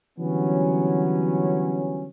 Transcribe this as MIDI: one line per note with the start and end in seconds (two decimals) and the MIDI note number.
0.18 2.07 50
0.18 2.07 52
0.18 2.07 54
0.18 2.07 55
0.18 2.07 59
0.18 2.07 61